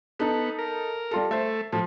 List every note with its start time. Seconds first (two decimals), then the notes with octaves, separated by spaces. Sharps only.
0.20 B3 D#4 A4
0.59 A#4
1.11 G3 F4 A4
1.31 A3 C5 E5
1.72 A2 F3